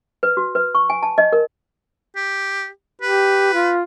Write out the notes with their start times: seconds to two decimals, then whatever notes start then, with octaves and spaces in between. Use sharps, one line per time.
0.23 B4
0.37 F#4
0.55 B4
0.75 C#6
0.90 G#5
1.03 A5
1.18 D#5
1.33 A#4
2.16 G4
3.02 G4 B4
3.54 F4